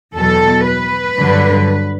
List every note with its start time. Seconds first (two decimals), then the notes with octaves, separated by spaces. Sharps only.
0.14 E2 B2 F#3 A4
0.67 B4
1.20 G2 D3 F#3